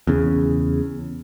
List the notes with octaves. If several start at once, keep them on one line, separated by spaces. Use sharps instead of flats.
E2 C#3